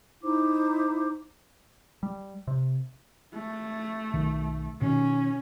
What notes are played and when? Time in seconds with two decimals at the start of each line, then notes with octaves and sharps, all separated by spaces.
0.22 D#4 E4 C5 D6
2.03 G3
2.48 C3
3.34 A3
4.14 B1 D#3
4.82 B2 D#3 C#4